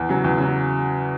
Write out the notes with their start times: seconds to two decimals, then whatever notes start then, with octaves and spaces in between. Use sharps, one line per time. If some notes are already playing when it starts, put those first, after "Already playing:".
Already playing: E2
0.09 C#3 F#3
0.24 E2
0.38 C#3 F#3